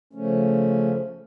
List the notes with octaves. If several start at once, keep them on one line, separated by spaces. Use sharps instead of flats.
C#3 F3 A3 C#4